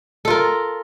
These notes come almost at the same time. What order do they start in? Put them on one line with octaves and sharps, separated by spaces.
A4 F4 A#4